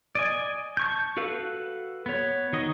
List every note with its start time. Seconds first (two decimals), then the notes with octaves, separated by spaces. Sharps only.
0.15 D5 D#5 G#5
0.77 A5 C#6 G6
1.17 F#4 A4 B4 F5
2.06 B3 C#5
2.53 D#3 F#4 D#5